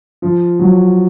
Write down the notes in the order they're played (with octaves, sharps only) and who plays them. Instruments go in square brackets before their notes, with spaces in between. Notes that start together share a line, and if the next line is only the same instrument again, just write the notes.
[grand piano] F3
F#3